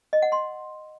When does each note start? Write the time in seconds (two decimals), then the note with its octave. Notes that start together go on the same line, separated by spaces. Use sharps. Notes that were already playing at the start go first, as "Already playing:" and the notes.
0.13 D#5
0.22 F#5
0.32 C6